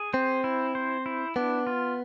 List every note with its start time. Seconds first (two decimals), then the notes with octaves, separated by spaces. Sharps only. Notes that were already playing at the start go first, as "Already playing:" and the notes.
Already playing: G#4
0.13 C4 C5
0.44 E4
0.75 C5
1.06 E4
1.36 B3 D4
1.67 F4